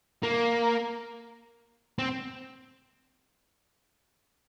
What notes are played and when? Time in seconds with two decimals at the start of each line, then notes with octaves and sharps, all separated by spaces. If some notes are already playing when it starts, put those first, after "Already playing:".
0.23 A#3
1.98 C4